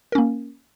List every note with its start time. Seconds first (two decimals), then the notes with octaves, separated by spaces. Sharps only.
0.12 A#4
0.15 C#4
0.18 A#3